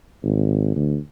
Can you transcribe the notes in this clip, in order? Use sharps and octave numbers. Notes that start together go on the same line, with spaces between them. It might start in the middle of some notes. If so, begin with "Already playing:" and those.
G#1
D2